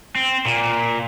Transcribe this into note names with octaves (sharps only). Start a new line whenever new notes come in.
C4
A#2